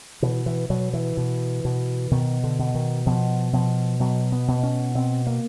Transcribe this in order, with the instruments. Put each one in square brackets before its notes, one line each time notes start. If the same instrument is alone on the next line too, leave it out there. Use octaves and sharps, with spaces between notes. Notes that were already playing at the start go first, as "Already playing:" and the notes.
[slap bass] B2 E3
E3
B2 F#3
E3
B2
B2
B2 D#3
D3
B2
D#3
B2 F3
B2 F3
B2 F#3
B3
B2
C#4
B2 C4
A#3